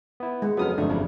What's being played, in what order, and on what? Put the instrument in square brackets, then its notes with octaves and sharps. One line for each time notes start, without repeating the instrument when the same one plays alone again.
[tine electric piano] B3 E4
[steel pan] G#3
[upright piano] F2 C#3 F#3 [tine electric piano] B3 D#6 F6
[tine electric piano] G1 F2 C3 [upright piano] A3 [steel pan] D4
[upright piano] C#3 E3